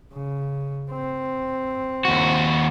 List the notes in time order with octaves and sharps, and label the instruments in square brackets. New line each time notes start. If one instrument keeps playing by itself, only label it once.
[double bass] C#3
C4
[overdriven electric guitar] D#2 F#4